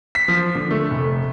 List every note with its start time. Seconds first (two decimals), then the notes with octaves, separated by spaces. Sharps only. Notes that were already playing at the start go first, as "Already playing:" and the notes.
0.15 B6
0.28 F3
0.55 D3
0.71 A3
0.91 F1